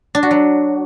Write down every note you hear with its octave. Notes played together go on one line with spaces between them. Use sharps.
D4
F#4
F#3